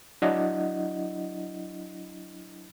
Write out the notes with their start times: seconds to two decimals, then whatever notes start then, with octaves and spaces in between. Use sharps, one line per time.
0.22 F#3 D4 E4 D#5 F#5